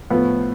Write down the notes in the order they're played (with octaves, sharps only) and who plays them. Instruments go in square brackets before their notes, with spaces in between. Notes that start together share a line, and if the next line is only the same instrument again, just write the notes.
[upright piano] A2 F3 A3 [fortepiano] B3